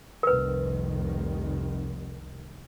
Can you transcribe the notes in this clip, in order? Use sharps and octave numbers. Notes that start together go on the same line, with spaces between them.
F1 C2 D#3 A#4 B4